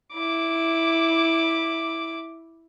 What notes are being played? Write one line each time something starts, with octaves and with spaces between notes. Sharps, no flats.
E4 D6